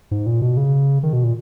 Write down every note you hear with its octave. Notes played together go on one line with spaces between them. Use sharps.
G#2
A#2
B2
C#3
D#3
B2
A#2